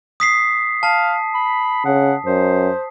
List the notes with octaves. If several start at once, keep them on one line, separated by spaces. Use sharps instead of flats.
D#6 B6 C7
F5 A5
B5
C#3 F#5
F#2 C5